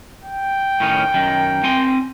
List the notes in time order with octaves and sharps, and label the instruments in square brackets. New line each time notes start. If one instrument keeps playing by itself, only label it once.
[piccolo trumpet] G5
[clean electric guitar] A2 D#3 C#4
F#2 D#3
C4 G#5 C6